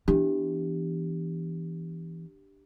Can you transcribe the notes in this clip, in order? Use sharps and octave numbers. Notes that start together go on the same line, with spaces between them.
E3 B3 D4 G4